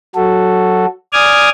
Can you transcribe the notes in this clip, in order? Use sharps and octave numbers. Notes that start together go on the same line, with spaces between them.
F#3 F#4 A4
D5 G#5 D6 D#6 F6 G#6